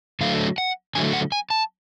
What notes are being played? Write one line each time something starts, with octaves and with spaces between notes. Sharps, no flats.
D3 F#3 A3 F5
F#5
D3 F#3 A3 G#5
F#5
G#5
A5